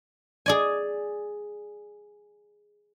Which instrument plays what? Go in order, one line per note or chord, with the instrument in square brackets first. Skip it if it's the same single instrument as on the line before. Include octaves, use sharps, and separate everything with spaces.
[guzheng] G#4 D5 G#5